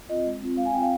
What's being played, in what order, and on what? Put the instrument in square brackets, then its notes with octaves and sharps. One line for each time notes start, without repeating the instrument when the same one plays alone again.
[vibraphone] C4 F4 D#5
G#3
C4 F4
G#3 F5
G#5
C4 G5
F4
F5